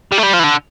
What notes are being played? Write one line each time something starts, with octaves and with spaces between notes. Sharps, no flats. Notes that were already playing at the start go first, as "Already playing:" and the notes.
G3
A3
G3
F3
E3
D3